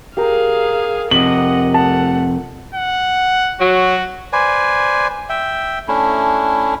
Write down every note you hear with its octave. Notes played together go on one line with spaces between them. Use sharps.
G4 G#4 A#4 F5
F2 C3 D#5 F#5 F#7
A3 F#5 A5
F#5
F#3 F#4
B4 C5 D5 G#5
E5 G5
A3 C#4 D4 E4